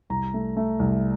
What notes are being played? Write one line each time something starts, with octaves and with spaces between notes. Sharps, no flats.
C2 A#5
A3
A3
C2